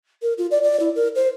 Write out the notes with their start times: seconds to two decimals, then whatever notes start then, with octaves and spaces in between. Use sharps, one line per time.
0.22 A#4
0.37 F4
0.51 D5
0.62 D5
0.79 E4
0.95 A#4
1.15 C5